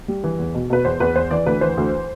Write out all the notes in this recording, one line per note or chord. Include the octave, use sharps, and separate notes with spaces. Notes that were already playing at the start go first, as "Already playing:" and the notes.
G3
E3
E2
B2
B2 B4
E2 C5
E2 B4
E2 C5
E3 D5
D2 B4
E3 C5
D2